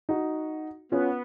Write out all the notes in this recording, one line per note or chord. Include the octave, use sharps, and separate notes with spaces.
D#4 F#4
B3 C#4 F4